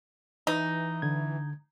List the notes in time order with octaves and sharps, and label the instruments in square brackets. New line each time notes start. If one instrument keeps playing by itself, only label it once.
[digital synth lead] E3 [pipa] D#4
[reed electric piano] D3 G#6